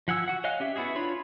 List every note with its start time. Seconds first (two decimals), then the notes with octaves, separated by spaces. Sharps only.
0.08 F3 F#5 G#5 E6
0.28 F#4 F#5
0.44 C#5 D#5 F5 G#5 F#6
0.60 C#4 G4 E5
0.76 B3 E4 F#4 G#4
0.95 D4 F4 C#5 B5